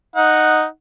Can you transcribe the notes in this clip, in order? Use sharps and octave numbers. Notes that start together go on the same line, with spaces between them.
D#4 F#5